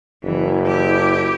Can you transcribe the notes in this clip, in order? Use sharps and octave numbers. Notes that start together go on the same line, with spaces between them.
F#1 E3
E4 G4